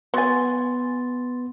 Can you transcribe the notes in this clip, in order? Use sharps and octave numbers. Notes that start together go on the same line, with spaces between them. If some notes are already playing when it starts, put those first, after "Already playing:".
F#3 B3 G#5 C6 A6